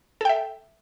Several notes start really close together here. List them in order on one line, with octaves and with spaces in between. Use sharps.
A4 G5 E5